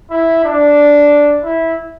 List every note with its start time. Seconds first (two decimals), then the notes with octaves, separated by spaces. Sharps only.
0.10 E4
0.44 D4
1.43 E4